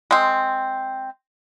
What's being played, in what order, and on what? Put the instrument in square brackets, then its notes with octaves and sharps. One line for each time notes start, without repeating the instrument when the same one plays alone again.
[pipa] G#3 C4